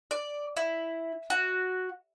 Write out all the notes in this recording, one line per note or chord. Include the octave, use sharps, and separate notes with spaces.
D5
E4
F#4